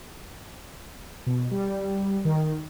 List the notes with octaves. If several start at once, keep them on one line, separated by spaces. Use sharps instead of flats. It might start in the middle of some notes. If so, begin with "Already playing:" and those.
B2
G3
D#3